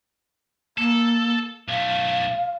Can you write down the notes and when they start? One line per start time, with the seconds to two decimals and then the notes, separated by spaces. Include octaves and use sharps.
0.78 A#3 A4
1.68 B1 A3 F5